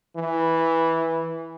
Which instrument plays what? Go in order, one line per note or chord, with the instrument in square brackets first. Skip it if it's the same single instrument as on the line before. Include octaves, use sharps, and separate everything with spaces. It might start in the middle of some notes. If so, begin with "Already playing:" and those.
[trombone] E3